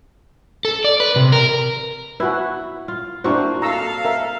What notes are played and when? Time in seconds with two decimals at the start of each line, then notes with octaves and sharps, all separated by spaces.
0.65 A4
0.84 D5
1.00 B4
1.16 C3
1.32 A#4
2.20 E4 F#4 B4
2.88 F4
3.24 A#3 C4 D4 E4 F#4 C5
3.62 A4 F5 A#5 E6
4.05 A#4 E5